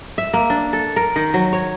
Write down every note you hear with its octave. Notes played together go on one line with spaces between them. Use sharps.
E5
A#3
D4
A4
A#4
D#3
F#3
C#5